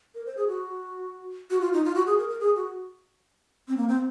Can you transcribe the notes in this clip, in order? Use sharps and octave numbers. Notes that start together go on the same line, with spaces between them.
A#4
C5
G#4
F#4
F#4
F4
D#4
F4
F#4
G#4
A#4
A#4
G#4
F#4
C4
A#3
C4